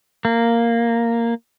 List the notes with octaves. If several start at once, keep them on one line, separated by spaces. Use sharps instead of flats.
A#3